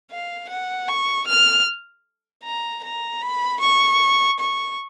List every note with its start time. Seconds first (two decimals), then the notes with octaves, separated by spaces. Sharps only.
0.11 F5
0.50 F#5
0.88 C#6
1.27 F6
2.44 A#5
2.84 A#5
3.22 B5
3.60 C#6
4.40 C#6